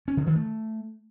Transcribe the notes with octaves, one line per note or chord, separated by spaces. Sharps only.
C#4
D3
D#3
A3